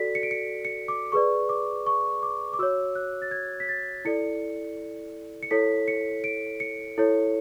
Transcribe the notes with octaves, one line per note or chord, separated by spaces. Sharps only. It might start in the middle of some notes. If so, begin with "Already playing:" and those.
Already playing: F#4 A4 D5 B6
C#7
D7
C#7
C#7
D6
G#4 B4 D5 C#6
D6
C#6
D6
D6
F#4 C#5 E6
F#6
A6
G#6
B6
A6
E4 A4 D5 C#7
C#7
E4 A4 C#5 B6
C#7
D7
C#7
E4 A4 C#5